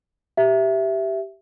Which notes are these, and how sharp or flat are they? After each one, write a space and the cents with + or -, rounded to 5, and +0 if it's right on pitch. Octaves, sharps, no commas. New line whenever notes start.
G4 -10 E5 +5